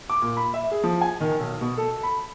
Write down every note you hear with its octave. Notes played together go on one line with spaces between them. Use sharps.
D6
A#2
B5
E5
G#4
F3
G#5
D#3
B1
B2
A4
B5